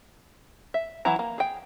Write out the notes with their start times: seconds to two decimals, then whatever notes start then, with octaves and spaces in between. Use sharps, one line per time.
0.74 E5
1.05 E3 F#3 E4 A#5
1.19 A#3
1.38 G#4 G5